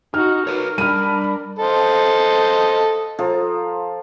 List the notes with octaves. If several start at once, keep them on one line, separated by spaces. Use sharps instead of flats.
D#4 F#4 F6
F#4 A#4 B4 C#5
G3 D4 D5 B5 F6 D#7
A4 C5 D#5
F3 A4 A#5